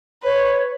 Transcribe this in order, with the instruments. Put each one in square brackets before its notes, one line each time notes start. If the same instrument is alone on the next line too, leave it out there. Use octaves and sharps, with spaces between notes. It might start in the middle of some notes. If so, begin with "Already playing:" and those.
[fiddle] B4 [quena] C#5